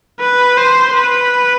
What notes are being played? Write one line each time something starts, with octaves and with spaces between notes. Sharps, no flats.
B4
C5
B4